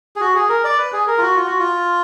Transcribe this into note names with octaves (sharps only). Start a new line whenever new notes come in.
G#4
F#4
G#4
A#4
D5
B4
G#4
A#4
F4
F#4
F4
F#4
F4